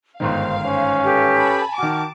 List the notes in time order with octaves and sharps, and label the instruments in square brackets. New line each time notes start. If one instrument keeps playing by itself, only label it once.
[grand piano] G1 G#2 D#3 [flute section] C5 [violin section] F5
[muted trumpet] C#4 [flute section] C5
[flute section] G4 A4 B4
[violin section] G#5 A5 B5
[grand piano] D#3 F#4 [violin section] A5 D6 [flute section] F6